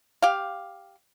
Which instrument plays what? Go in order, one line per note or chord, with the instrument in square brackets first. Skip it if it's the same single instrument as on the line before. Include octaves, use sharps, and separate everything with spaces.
[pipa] G4 F5